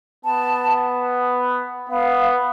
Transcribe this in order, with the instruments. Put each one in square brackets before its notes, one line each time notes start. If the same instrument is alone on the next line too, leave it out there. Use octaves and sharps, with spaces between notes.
[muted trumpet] B3 [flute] A5
[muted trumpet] B3 [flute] F5